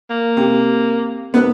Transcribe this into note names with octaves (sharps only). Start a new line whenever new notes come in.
A#3
C3
C3 B3 B4